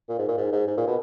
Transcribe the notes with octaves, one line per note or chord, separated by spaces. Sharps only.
A#2
G#2
A#2
G#2
G#2
G#2
A#2
B2